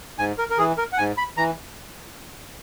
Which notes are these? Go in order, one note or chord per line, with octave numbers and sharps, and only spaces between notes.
G#2 G#5
A#4
A#4
E3 G#4
A#4
F#5
G#2 G#5
B5
E3 A#5